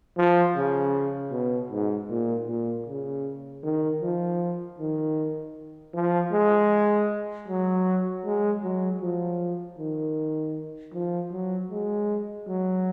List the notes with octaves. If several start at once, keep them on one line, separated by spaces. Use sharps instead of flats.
F3
C#3
B2
G#2
A#2
A#2
C#3
D#3
F3
D#3
F3
G#3
F#3
G#3
F#3
F3
D#3
F3
F#3
G#3
F#3